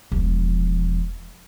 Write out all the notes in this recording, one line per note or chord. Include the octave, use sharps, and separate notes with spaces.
E1 F3